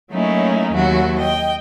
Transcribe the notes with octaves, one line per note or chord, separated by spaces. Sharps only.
F#3 A3 A#3 C#4 D#4 E4
D#2 F#3 E4 F#4
D#5 G5